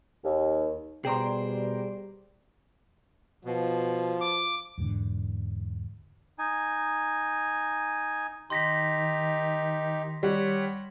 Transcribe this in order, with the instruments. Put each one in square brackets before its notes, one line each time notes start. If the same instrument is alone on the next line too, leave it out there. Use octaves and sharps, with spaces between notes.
[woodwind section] D#2
[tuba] B2 [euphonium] G3 [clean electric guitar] G#4 C5 D5 [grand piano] G5 A#5 C6
[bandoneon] B2 [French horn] F3
[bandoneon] D6
[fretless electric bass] E2 G#2 D3
[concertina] D#4 G#5
[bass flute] D#3 [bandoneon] D#4 G4 [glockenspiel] C6 A#6 B6
[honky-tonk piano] G3 [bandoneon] C#5 F#5